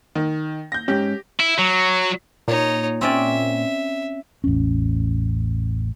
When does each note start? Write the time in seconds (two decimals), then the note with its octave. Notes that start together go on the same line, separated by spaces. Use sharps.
0.15 D#3
0.72 G6 A#6
0.88 G#2 C#4 G4
1.39 E4
1.58 F#3
2.48 A#2 D#4 C#5
3.01 C4 C#4 D5 E5
4.44 A1 E2 C#4